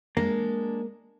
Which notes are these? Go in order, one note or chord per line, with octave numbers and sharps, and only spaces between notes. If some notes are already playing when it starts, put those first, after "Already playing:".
G#3 A#3 D4